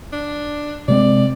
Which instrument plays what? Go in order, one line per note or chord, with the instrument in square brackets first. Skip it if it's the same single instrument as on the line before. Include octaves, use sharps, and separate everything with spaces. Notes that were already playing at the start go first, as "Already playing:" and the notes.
[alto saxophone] D4
[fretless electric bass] C3 G#3 C4 [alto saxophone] D5